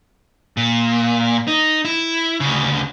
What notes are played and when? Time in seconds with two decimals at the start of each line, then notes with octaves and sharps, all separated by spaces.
0.57 A#2
1.48 D#4
1.85 E4
2.40 D2 C#3